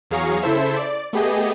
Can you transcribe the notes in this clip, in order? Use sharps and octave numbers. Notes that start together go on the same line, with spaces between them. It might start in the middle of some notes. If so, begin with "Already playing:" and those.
E2 F#3 G#4 F5 A#5 C#6
C#3 E4 A4 C5 E5
D5
A3 B3 G4 G#4 D#5